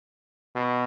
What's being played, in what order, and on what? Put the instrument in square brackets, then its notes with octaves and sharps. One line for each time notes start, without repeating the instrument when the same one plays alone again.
[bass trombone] B2